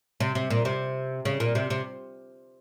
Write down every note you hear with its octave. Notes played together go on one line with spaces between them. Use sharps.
C3
C3
A#2
C3
C#3
A#2
C3
C3